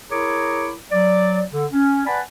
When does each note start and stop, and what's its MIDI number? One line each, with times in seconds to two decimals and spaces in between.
0.10 0.70 64
0.10 0.70 68
0.10 0.70 70
0.10 0.70 73
0.10 0.70 82
0.10 0.70 86
0.92 1.41 54
0.92 1.41 74
1.51 1.65 50
1.72 2.05 61
2.05 2.20 71
2.05 2.20 74
2.05 2.20 78
2.05 2.20 80
2.05 2.20 81
2.05 2.20 83